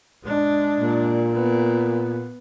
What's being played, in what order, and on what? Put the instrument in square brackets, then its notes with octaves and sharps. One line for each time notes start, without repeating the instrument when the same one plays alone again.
[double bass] G#3 D4
[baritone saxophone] A#2
[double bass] B3